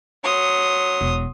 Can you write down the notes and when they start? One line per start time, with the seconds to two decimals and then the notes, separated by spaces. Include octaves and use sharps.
0.24 F#3 C6 D#6
1.01 E1